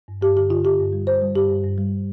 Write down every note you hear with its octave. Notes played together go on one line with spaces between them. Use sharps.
G2
G2 G4
D3 G4
D3 F4
D3 G4
G2
G3
G3 C5
G3
G2 G4
G2
G2
G3